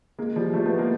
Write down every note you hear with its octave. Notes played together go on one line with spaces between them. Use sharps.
G#3 A#3
F3 G3
G3 A3
A3 B3
G#3 A#3